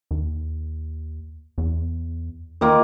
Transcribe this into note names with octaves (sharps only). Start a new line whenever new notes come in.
D#2
E2
D#2 D#3 A#3 F4